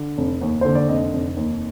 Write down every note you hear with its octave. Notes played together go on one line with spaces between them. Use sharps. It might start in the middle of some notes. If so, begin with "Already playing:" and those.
Already playing: D3
F1
D#2
D3 C5
D5
F1 D#5
F1
D#2